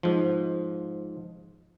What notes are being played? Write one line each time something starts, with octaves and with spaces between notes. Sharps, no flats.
G#2 F3